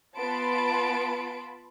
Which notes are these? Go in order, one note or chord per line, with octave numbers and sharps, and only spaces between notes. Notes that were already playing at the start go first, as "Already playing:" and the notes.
B3 F4 A5 B5 C6 D7